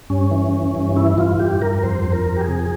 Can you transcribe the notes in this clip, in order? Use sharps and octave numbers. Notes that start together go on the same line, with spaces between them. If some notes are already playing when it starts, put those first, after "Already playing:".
G2 C#4
E3
E3
G2
E3 E4
G2 F4
G2 G4
G2 A#4
A#4
F2 C5
F2
A#4
F2
G4
G#4
C3